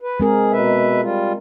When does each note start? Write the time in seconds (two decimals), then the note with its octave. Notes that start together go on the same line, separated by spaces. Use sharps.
0.01 B4
0.20 G#3 C4 G#4 A#4
0.53 B2 B4 E5
1.02 G3 F4